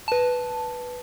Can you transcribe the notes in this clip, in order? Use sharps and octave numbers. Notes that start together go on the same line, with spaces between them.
B4 A5